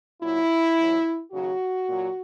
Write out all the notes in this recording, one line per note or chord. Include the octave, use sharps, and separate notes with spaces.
A#2 F#3 E4
E2 B2 F#3
D#2 C#3 F#3 F#4
A#2 F#3